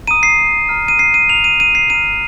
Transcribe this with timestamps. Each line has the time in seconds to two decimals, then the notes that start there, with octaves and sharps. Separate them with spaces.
0.07 A#5 D#6 D#7
0.23 C7
0.69 A#5 F6
0.88 D#7
0.99 C7
1.14 D#7
1.29 A#5 F6 F7
1.44 D#7
1.60 D#7
1.75 C7
1.90 A#5 F6 D#7